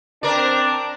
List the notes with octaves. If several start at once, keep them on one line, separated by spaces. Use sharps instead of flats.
C4 D4 A#4 D5